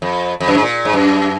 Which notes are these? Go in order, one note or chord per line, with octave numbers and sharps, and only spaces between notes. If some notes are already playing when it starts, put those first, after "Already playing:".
F2
F2
F#2
G#2
A#2
G#2
F#2